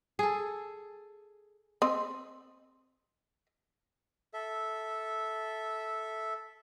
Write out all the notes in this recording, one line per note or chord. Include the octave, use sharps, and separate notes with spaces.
G#4 A4
C4 D#5
A4 E5